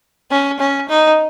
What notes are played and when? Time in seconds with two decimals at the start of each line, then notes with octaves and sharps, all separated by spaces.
0.31 C#4
0.60 C#4
0.89 D#4